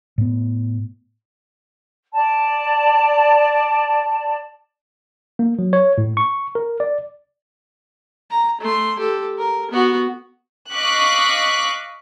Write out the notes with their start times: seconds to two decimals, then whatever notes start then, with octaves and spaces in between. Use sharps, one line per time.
0.18 A2 B3
2.14 D5 A5
5.39 A#3
5.59 F#3
5.73 C#5
5.98 A2
6.17 C#6
6.55 A#4
6.80 D5
8.31 A#5
8.61 A3 C6
8.99 G4 A4
9.38 A#4
9.71 B3 F#4
10.72 D#5 F5 C#6 D6 F#6 B6